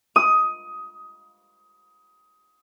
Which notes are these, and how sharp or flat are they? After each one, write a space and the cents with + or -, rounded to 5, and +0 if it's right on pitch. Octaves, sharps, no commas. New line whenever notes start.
D#6 +15